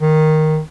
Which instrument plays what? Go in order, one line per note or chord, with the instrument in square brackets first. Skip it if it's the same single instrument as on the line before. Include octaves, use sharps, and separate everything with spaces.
[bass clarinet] D#3